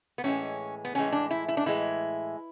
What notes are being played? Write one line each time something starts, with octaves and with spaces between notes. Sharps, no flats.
B3
A2 E3 G#3 C#4
B3
A2 E3 G#3 C#4
D4
E4
E4
D4
A2 E3 G#3 E4